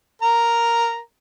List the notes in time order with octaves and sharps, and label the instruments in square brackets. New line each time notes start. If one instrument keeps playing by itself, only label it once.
[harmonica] A#4 A#5